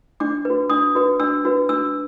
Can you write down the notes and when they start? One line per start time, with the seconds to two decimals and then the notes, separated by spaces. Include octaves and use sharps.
0.20 D4 D6
0.45 F#4 B4
0.70 D4 D#6
0.95 F#4 B4
1.20 D4 E6
1.45 F#4 B4
1.69 D4 E6